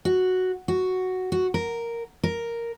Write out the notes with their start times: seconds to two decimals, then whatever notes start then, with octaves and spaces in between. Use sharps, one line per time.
0.05 F#4
0.68 F#4
1.32 F#4
1.54 A#4
2.23 A#4